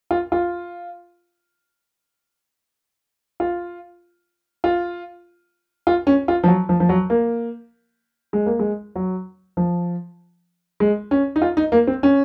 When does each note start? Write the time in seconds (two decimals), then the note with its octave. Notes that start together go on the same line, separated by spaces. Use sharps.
0.11 F4
0.32 F4
3.40 F4
4.64 F4
5.87 F4
6.07 C#4
6.28 F4
6.44 F3
6.48 F#3
6.69 F3
6.80 F3
6.89 F#3
7.10 A#3
8.33 G#3
8.46 A#3
8.59 G#3
8.95 F#3
9.57 F3
10.80 G#3
11.11 C#4
11.36 D#4
11.42 F4
11.57 D#4
11.72 A#3
11.87 C4
12.03 C#4